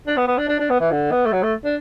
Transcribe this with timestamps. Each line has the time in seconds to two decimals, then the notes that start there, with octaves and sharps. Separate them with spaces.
0.08 D4
0.17 B3
0.28 B3
0.38 D4
0.49 D4
0.60 D4
0.70 B3
0.80 E3
0.92 D3
1.12 B3
1.26 A3
1.32 F#3
1.43 A3
1.65 D4